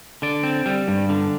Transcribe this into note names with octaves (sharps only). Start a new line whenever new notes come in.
D3 D5
C4
G3
G2
D3